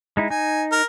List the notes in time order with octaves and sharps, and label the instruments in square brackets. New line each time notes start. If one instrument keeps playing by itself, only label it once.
[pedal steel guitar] G#3 D#4 E4
[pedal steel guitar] D#4 [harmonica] G#5
[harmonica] A#4